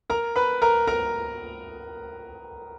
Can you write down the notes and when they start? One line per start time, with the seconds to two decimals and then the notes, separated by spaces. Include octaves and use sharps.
0.10 A#4 A#5
0.36 B4 B5
0.62 A#4 A#5
0.87 A#4 A#5